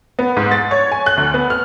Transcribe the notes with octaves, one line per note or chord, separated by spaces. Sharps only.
B3
G#2
A6
C#5
G#5
F#6
D2
B3
F6